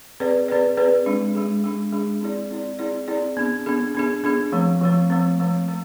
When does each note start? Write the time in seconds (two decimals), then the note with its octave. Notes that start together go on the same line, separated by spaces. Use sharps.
0.20 C4 G#4 B4 D5
0.48 C4 G#4 B4 D5
0.77 C4 G#4 B4 D5
1.06 G#3 D4 G#4
1.35 G#3 D4 G#4
1.64 G#3 D4 G#4
1.92 G#3 D4 G#4
2.21 C4 E4 G#4 D5
2.51 C4 E4 G#4 D5
2.79 C4 E4 G#4 D5
3.08 C4 E4 G#4 D5
3.37 B3 D4 G#4
3.66 B3 D4 G#4
3.95 B3 D4 G#4
4.24 B3 D4 G#4
4.52 F3 A3 C4
4.81 F3 A3 C4
5.10 F3 A3 C4
5.39 F3 A3 C4
5.68 A3 C4